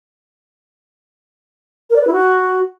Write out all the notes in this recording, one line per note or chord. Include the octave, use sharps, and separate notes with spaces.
A#4
D5
B4
E4
F#4